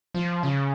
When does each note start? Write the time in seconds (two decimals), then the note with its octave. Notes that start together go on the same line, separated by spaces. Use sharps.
0.14 F3
0.43 C#3